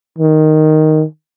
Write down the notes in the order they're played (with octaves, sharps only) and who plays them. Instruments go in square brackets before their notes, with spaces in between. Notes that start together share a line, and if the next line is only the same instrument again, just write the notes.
[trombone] D#3